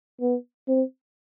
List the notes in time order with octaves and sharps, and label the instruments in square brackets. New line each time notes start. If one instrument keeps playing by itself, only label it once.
[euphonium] B3
C4